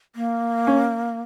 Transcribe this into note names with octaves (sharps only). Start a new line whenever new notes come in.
A#3
C#4